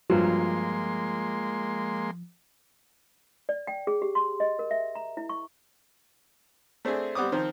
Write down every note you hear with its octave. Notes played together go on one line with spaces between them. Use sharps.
G2 F3 F#3 G#3 A#3 C6
D5
G5
G#4
G4
C6
D#5
A#4
E5
A#5
E4
C#6
A3 C4 D4 G#4
G3 B3 C4 D6 D#6
D#3 F3 C4